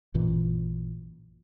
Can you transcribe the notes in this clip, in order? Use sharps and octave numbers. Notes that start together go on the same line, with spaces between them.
A1 F#2 A#2 E3